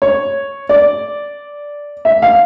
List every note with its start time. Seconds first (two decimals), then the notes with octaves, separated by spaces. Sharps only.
0.02 C#5
0.69 D5
2.05 E5
2.22 F5